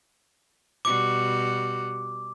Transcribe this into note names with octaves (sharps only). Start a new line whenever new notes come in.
B2 G3 F#4 D6